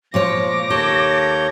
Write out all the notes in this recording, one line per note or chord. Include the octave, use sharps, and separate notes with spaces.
A#2 F3 G#3 C#5 D6 A#6
D#2 A4 C#5 G6